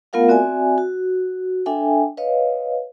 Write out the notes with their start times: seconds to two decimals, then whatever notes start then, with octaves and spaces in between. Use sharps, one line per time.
0.13 A3 B3 F4 A#4 F5 F#5
0.28 C4 F#4 D5 E5 G#5
0.78 F#4
1.66 D4 A4 E5 G5 G#5
2.17 B4 C#5 D#5 F5